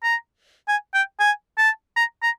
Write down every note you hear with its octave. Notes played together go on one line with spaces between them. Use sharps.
A#5
G#5
G5
G#5
A5
A#5
A#5